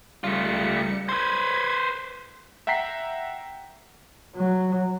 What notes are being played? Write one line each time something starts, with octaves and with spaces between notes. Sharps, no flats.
C#2 G3 A3 F4 C#7
B4 C5 G#6
E5 F#5 G5 A#5 B6 C7
F#3